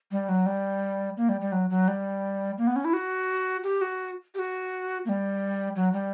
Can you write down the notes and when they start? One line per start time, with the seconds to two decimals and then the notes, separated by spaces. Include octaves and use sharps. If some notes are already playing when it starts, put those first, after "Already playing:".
0.12 G3
0.29 F#3
0.46 G3
1.17 A#3
1.29 G3
1.41 G3
1.52 F#3
1.70 F#3
1.88 G3
2.58 A#3
2.67 B3
2.76 C#4
2.85 E4
2.93 F#4
3.64 G4
3.81 F#4
4.35 G4
4.39 F#4
5.05 A#3
5.09 G3
5.76 F#3
5.93 G3